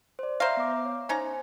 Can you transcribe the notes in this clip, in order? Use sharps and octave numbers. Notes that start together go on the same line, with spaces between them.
C5 D5
C5 E5 F5 A#5 A#6
B3 D6
C#5
C#4 D#4 C5 A#5